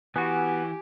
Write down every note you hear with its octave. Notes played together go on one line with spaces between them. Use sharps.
E3 B3 F#4 G4 G#5